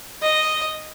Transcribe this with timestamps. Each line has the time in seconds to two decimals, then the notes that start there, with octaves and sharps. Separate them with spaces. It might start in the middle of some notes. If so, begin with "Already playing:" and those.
0.22 D#5